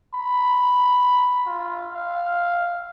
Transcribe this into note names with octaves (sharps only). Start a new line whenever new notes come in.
B5
F4
F5